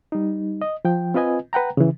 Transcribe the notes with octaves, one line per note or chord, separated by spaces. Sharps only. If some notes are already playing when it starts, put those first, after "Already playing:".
G3 D#4
D#5
F3 G5
C4 F4 B4 D#5 G#5
B4 F#5 G5 A#5
C#3 E3